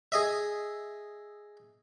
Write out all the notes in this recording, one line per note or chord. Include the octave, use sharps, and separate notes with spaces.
G#4 D#5 E5